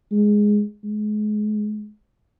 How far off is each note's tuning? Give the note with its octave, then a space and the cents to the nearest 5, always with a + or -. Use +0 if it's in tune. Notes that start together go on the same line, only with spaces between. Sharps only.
G#3 +0
G#3 +30